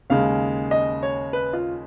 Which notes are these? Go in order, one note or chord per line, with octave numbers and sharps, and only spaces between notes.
D#2 C#3 G#3 F5
D#5
C#5
B4
F4